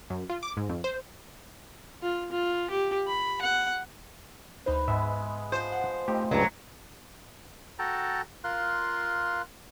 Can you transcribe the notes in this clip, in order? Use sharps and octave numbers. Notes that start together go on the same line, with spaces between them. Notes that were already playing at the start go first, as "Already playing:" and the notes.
F#2
F4
D6
G#2
F2
C5
F4
F4
G4
B5
F#5
D2 D#4 B4 C5
G#2 G#3 B3 E5
F3 C5
F#5
F3 A3 C4 D#4 G4
C#2 G2 F#3 G#3
F#4 A4 G5 A5 A#5
F4 A#4 F5 C6 F#6